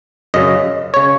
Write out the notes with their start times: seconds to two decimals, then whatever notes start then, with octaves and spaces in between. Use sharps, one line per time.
0.34 F#2 C#3 D#5
0.94 C#3 C#5